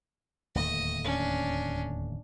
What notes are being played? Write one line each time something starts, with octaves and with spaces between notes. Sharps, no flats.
D1 D#2 A3 D#5
C#4 D4